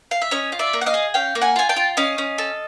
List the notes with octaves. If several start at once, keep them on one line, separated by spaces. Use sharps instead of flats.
F5
E5
C#4 C#5 D#5
F4
D5 E5
A#3
F#5
D#5 F5
G#4
C#4 F5 G5
A#3
F#5 G#5
F4 G#5
G5 A5
F4
C#4 D#5 F5
C#4
A4